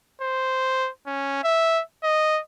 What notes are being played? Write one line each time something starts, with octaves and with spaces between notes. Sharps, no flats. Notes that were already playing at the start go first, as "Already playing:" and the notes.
C5
C#4
E5
D#5